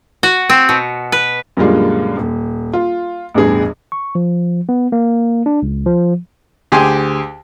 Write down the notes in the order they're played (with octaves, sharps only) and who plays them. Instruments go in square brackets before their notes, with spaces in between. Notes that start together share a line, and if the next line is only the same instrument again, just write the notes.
[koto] F#4
C4
B2
B4
[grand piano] F#2 A#2 D3 G3 G#3 F4
D#1
F4
A1 E2 G2 G#4
[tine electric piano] C#6
F3
B3
A#3
D4
C#2
F3
[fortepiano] D2 G4 G#4 G#5 C6